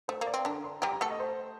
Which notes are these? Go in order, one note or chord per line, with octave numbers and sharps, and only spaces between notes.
A3 C5
A#3
D5
C4
D3 D4 A#5
C6
G3 G4 A#5
A#5
A3 A4 F#5
D#5
C5